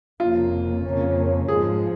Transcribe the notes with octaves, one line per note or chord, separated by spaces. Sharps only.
F1 F2 C#3 A#3 F4
F2 C#3 A#3 C#4
G#2 F3 G#3 G#4